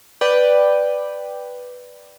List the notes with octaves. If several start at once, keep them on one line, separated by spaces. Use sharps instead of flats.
B4 D5 G5